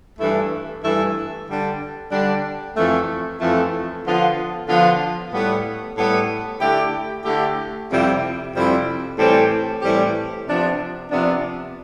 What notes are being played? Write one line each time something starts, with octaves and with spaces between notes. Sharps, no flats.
G2 E3 A3 E4 A4
G2 E3 A3 E4 A4
D3 G3 D4
D3 G3 D4
F2 E3 A3
F2 E3 A3
D3 F3 B3 F4
D3 F3 B3 F4
A2 G3 B3
A2 G3 B3
D3 A3 E4 G4
D3 A3 E4 G4
F2 C3 G3 C4 E4
F2 C3 G3 C4 E4
A2 E3 G3 C4 G4
A2 E3 G3 C4 G4
C3 F3 B3 D4
C3 F3 B3 D4